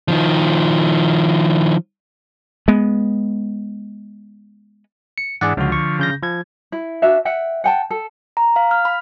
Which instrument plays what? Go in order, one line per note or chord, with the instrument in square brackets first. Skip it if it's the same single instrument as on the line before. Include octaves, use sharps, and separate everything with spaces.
[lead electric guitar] D#3 F3
[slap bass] G#3 B3
[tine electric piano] C#7
[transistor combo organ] G#2 E3 D4 [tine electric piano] G#4 D5 F#5
[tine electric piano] C#2 F#4 [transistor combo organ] D3 F3
[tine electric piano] C#6
C#3 G6 A#6
F3 G#6
[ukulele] E4
D4 F#4 E5 F5
E5 F#5 G5
F#5 G5 A5
A4
[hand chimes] A#5
F5
F6
B5